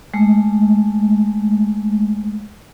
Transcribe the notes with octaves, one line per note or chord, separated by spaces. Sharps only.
G#3 A3